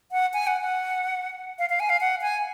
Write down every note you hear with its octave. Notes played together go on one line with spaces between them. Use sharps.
F#5
G#5
F#5
F#5
F5
F5
G#5
F5
F#5
G#5